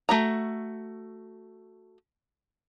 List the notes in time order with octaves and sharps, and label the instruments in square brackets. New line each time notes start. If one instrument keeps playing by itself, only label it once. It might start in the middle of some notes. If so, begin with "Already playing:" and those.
[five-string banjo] A3 F#4 A#5